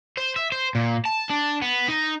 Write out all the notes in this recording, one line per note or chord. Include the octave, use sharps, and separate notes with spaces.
C5
E5
C5
A#2
A5
D4
B3
D#4